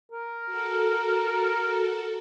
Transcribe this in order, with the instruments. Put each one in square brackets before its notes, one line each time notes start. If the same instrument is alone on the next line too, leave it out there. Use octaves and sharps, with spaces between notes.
[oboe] A#4
[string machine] F#4 A4